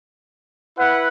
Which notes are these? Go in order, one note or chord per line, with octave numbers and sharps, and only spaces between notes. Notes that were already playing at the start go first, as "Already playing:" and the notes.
E4 B4 F#5